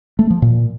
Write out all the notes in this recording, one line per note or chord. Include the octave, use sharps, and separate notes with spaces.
A3
F3
A#2